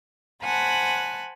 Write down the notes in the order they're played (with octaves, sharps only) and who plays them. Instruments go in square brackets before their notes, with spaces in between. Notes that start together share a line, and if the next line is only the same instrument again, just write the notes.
[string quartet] C5 F#5 G#5 A5 B5 F#6